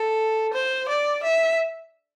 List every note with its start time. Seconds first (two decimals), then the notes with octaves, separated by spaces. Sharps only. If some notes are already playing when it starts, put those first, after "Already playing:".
Already playing: A4
0.53 C5
0.89 D5
1.24 E5